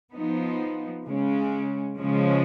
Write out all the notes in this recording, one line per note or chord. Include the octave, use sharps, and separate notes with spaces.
F3 B3 D#4
C#3 G#3 C#4
C#3 F3 G#3 C#4